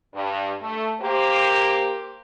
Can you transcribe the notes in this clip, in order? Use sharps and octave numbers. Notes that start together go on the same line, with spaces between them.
G2
A3
A#3 G4 C5